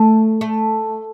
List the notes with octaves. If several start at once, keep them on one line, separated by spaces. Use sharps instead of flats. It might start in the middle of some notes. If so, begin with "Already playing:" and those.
Already playing: A3
A3